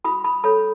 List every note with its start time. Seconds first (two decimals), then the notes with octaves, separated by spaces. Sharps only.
0.04 F#4 B5 D#6
0.24 B5 D#6
0.44 A4 C#5 B5 D#6